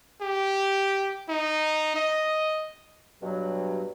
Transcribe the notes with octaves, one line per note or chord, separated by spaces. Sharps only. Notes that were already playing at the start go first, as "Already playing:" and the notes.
G4
D#4
D#5
G2 B2 F#3